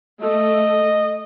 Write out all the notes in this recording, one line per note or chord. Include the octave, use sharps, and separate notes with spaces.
A3 D#5